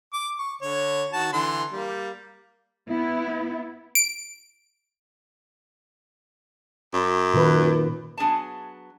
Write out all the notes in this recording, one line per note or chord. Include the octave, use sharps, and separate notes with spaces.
D6
C#6
D3 C#5
D#3 F#4 A5
D3 E3 C6
G3 A#3
B3 E4
D7
F#2
A#2 D#3 B4
F#3 B3 D4 G#4 G#5 A5